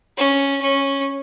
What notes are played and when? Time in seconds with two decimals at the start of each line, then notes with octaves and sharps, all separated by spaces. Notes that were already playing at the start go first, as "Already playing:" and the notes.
0.17 C#4
0.61 C#4